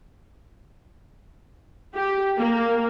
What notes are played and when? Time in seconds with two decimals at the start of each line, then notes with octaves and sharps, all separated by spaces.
1.95 G4
2.37 A#3